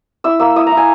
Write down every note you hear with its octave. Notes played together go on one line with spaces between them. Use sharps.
E4 E6
A#3 E6
E4 D#6
A#5
E4
G#5